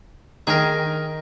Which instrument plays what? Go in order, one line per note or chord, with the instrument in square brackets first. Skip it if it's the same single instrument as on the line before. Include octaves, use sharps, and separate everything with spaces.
[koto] D#3 G5 [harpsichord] G#4 A#4